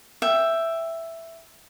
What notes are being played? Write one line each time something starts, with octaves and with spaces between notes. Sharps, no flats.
E5 G5